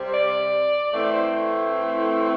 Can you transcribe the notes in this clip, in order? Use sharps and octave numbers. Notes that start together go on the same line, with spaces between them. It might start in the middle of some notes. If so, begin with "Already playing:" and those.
Already playing: C3 G3 C4
D5
A2 E3 A3 C4 D5
C5